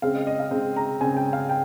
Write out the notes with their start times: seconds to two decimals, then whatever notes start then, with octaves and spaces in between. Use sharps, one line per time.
0.02 C#3 G#3 C4 F5
0.15 D#5
0.27 D#5
0.39 F5
0.51 C#3 G#3 C4
0.76 A#5
1.01 C#3 G#3 C4 G#5
1.17 G5
1.33 F5
1.49 G5